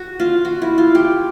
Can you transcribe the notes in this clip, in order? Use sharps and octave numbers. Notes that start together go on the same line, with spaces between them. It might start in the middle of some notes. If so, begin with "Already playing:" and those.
Already playing: F#4
F4
F#4
E4
F4
G4